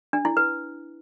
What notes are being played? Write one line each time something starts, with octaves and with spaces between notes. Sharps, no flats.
D4
E4
B4